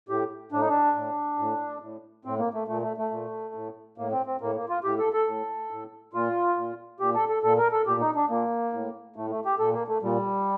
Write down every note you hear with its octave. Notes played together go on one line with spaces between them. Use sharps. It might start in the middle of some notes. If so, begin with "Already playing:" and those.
A2 G4
A2 D4
D#4
D4
A2
A2
A2
A2 C4
A#3
A3
A#2 A3
A3
A3
A#2
A2
A2 A#3
C4
C4
A2 A#3
A#3
F4
A2 G4
A4
A4
A2
A2
A#2 F4
A#2
A#2 G4
A4
A4
A#2 A4
A#4
A4
A#2 G4
D#4
D4
A#2 A#3
A2
A2 A3
A3
G4
A#2 A4
A#3
A3
A#2 G3